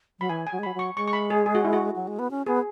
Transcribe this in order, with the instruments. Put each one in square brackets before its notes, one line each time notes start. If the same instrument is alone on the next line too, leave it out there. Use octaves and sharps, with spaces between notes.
[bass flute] F#3 [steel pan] B5
[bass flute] E3 [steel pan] G#5
[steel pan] G#5
[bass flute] F#3
G#3
[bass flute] F#3 [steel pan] B5
[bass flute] F#3 [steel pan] C#6
[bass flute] G#3 [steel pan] C#6
[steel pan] C#6
B5
G#4
G#4
F#4
E4
F#4
[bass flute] F#3
G#3
B3
C#4
[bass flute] B3 [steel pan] G#4